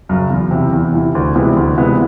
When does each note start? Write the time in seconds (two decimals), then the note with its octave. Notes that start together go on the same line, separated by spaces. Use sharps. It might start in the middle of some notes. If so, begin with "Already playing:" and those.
0.09 F#2 C#3
0.30 E2
0.51 C3 E3
0.72 E2
0.94 C3 E3
1.15 D2
1.36 C3 E3 G#3 B3
1.56 D2
1.77 C3 E3 G#3 B3